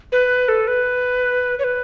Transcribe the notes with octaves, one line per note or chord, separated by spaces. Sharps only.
B4
A4
B4
C#5
B4